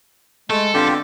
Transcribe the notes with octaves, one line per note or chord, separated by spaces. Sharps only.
G#3 A3 A4
D3 B3 C4 F4 G4